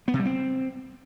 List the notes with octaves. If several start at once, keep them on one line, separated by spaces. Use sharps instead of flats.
B3
C3
G3
C4